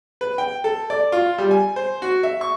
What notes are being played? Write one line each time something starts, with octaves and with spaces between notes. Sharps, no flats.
B4
G5
A4
D5
F4
G3
G#5
C5
F#4
E5
C#6